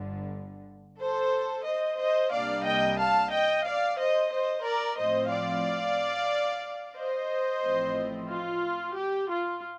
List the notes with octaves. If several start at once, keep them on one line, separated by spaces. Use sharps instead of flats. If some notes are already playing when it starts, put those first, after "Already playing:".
Already playing: G1 G2 D3
A4 C5
C5 D#5
C5 D#5
C2 C3 G3 A#3 D4 D5 F5
D#5 G5
F5 A5
D#5 G5
D5 F5
C5 D#5
C5 D#5
A#4 D5
A2 F3 C4 C5 D#5
D5 F5
C5 D#5
A1 A2 F3 C4
F4
G4
F4